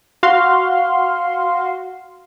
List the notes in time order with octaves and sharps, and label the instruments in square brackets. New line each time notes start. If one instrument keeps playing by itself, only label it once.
[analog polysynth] F#4 F5 C6